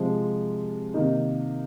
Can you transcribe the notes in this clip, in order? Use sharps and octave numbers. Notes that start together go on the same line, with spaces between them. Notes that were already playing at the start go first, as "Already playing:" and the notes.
Already playing: C3 F3 G#3 C4
C3 D#3 A#3 D#4